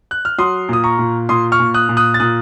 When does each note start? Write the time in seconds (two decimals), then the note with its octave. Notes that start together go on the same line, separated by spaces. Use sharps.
0.11 F#6
0.25 F6
0.38 F#3 C6 D#6
0.69 A#2 D#6
0.84 A#5 C#6
0.99 A#2
1.29 A#2 C6 D#6
1.52 C#6 F6
1.60 A#2
1.74 D#6 F#6
1.89 A#2
1.97 D#6 F#6
2.14 A6
2.20 A#2 D#6 F#6